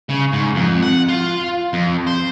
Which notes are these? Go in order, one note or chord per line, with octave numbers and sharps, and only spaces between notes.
C#3
G#2
F2
F#5
F4
F2
C5